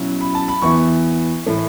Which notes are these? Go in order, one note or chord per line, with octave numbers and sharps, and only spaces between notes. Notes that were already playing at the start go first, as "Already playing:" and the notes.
Already playing: B2 F#3 C#4 E4
B5
A5
B5
E2 E3 B3 E4 C#6
A2 E3 A3 E4